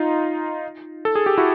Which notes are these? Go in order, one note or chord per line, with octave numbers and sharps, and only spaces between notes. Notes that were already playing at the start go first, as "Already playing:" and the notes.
Already playing: D#4 F4
A4
G#4
G4
E4 F#4